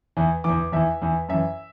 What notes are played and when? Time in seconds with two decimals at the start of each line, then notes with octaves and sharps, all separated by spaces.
0.17 E2 E3
0.44 E2 E3 D6
0.72 E2 E3 E5
1.02 E2 E3
1.29 F#2 E3 E5